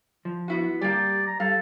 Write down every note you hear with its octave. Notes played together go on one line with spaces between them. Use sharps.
F3
B3 E4 F#4
G3 A#3 G4 D5
A#5
G3 A4 F5